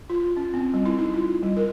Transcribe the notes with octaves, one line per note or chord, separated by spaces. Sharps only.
F4
C#4
C4
G3
E4
D#4
F4
G3
A#4